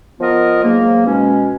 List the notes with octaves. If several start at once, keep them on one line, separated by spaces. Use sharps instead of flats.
F3 B3 F4 A#4 D#5
G#2 F#3 A#3
B2 G#3 C#4